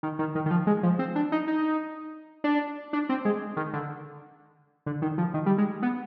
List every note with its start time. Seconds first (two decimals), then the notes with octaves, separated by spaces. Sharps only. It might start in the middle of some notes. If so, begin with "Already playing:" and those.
0.03 D#3
0.19 D#3
0.35 D#3
0.46 D#3
0.51 F3
0.67 G#3
0.83 F3
0.99 C4
1.16 D4
1.32 D#4
1.48 D#4
2.44 D4
2.93 D4
3.09 C4
3.25 G#3
3.57 D#3
3.73 D3
4.86 D3
5.02 D#3
5.18 F3
5.34 D#3
5.46 G3
5.58 G#3
5.82 B3